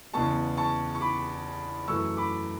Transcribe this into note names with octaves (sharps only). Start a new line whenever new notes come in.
E2 C#3 G#3 B3 A5 C#6
A5 C#6
C#6
B5 D6
F#2 E3 A3 C#6 E6
B5 D6